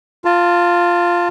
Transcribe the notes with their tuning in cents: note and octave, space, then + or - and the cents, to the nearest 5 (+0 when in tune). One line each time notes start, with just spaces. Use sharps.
F4 +0 A5 +25